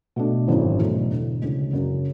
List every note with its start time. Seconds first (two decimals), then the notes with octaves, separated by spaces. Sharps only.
0.16 B2 A3 D4
0.48 G#1 F#2 E3 B3 D4
0.79 E2 B2 F#3 A3
1.10 E1 D2 D3
1.42 D2 C#3 E3 G#3
1.73 F#2 C#3 F#3